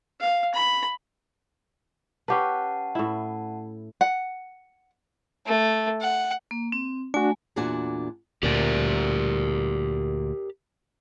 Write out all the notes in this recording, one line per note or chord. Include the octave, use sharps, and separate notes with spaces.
F5
B5
C#4 G4 B4 F#5 A5
A2 E4
F#5
A3
F#5
A#3
C4
A3 D4 F#4 G#5
E2 A#2 D4 F#4 F#5 G#5
D2 A#2 G4 A#4 D5